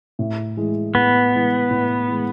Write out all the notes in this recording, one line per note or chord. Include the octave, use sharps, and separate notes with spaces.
A2
E3 G#3
A2 B3
E3 G#3
A2
E3 G#3